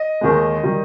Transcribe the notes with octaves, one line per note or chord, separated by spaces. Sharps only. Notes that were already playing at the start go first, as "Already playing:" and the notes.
Already playing: D#5
D#2 D#3 G#3
D#3 G3